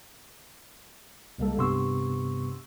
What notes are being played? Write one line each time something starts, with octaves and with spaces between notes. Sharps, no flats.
C2 G#3 A#3 A4
G2 C3 B3 C6 C#6 E6